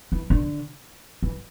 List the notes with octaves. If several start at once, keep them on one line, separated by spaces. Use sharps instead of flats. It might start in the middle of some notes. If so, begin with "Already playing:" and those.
E3
D3
E3